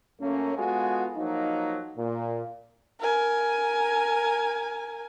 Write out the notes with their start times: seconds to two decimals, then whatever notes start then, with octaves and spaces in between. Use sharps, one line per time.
0.20 F#2 A3 A#3 C#4
0.57 G#3 B3 F4 F#4 A4 G#5
1.17 F3 F#3 A#3 D#4
1.97 A#2
3.01 A#4 G#5